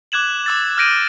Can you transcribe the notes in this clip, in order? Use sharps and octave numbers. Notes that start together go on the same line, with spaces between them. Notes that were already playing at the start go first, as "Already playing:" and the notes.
D6 F#6 G#6 E7 F#7
D6 E6 A6
F6 G6 A#6 D7 D#7